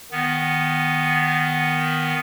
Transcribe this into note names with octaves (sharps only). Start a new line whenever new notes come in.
D#3 B3